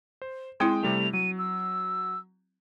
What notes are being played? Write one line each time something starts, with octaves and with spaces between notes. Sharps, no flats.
C5
G#3 C4 E4 G5 C6 D#6
C3 G3 A3 F7
F#3 D#7
E6